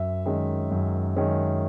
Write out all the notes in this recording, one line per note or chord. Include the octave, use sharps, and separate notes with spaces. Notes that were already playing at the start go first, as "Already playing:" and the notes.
Already playing: F#2 E5
D#3 G#3 C#4
F#2
D#3 G#3 C#4